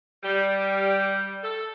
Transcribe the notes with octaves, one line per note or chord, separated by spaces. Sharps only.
G3
A4